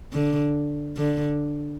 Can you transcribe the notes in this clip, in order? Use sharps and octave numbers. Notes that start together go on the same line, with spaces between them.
D3
D3